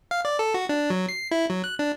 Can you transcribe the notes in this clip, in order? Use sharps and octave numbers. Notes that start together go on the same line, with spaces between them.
F5
D5
A4
F#4
D4
F#3
C7
E4
F#3
F#6
D4